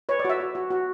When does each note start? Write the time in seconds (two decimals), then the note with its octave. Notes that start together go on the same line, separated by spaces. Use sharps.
0.09 B4 C#5
0.19 D5
0.25 F#4 E5
0.40 F#4
0.55 F#4
0.70 F#4